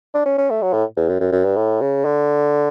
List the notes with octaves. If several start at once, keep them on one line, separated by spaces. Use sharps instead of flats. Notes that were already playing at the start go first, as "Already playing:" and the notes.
D4
C#4
C#4
A3
F#3
A2
E2
F#2
F#2
F#2
G2
A2
C#3
D3